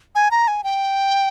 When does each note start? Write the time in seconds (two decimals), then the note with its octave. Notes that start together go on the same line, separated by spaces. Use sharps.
0.15 G#5
0.31 A#5
0.48 G#5
0.64 G5